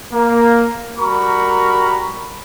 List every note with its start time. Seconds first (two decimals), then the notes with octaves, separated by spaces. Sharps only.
0.13 A#3 A#4
0.99 G3 F#4 A#4 A#5 B5 C#6